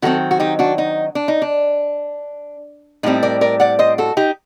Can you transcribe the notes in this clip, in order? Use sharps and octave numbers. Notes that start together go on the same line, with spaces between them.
D#3 F#3 C4 F#4 A4
F#4
D#4 G4
D4 F#4
D#4
D4
D#4
D4
A2 G3 C4 D#4
A#4 D5
A#4 D5
D5 F#5
C5 D#5
F#4 A4
D#4 G4